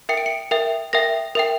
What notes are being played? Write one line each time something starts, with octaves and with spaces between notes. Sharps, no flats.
A#4 E5 G5 C#7
D7
C#7
A#4 E5 G5
A#4 E5 G5 A#6
A#4 E5 G5